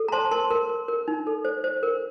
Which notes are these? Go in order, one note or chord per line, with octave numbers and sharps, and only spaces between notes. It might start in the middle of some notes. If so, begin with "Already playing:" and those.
Already playing: A4
A#5
C5 A5 C6
A#4 A5 C6
A#4
A#4
A#4
D#4
A4
C5
C5
A#4